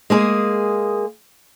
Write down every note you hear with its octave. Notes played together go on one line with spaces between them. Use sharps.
G#3 A#3 G#4